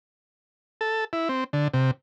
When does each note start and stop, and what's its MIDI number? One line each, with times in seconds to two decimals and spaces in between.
0.81 1.04 69
1.13 1.28 64
1.29 1.44 60
1.53 1.68 50
1.73 1.91 48